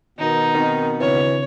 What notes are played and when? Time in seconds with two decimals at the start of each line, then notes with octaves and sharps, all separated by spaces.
0.19 B2 D#3 B3 D#4 A#4
0.55 D#3 C4
1.00 C#3 E3 C4 D4 C#5